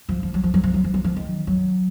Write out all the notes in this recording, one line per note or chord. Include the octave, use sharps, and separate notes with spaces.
F3
F3
F#3
F3
F#3
F3
F#3
F3
F#3
F3
D#3
F#3